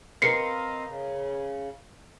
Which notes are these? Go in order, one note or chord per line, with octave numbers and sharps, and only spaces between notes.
C4 A#4 B4 D#5 F5 C7 C#7
C#3